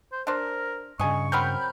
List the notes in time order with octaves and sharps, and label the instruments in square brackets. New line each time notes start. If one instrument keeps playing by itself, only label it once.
[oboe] C5
[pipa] D4 C5 [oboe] A#4
[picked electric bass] G2 C#3 [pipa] D#5 G#5 [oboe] C#6
[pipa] F#3 C4 A#4 [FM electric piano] B5 F6 G6